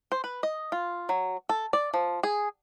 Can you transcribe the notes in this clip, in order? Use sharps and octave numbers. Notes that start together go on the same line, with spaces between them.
C5
B4
D#5
F4
F#3
A4
D5
F3
G#4